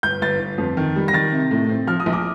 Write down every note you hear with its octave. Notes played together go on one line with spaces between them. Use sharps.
G1 G6
G1 A6
G1
F2
D#3
G3
A#6
D#3 A6
C3
A2
C4
F3 F6
D#6
A#1
D6